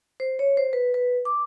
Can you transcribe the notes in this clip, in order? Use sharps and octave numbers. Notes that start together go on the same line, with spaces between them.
C5
C#5
C5
B4
B4
D6